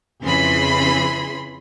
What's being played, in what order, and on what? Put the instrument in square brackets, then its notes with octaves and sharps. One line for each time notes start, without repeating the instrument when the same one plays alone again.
[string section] F2 C#3 E3 G#4 B5 C6